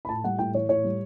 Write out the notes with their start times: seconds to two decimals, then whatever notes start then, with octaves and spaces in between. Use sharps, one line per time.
0.05 B5
0.09 A2 A5
0.24 G3 F#5
0.38 A2 G5
0.54 E3 C#5
0.69 A2 C#5
0.84 G3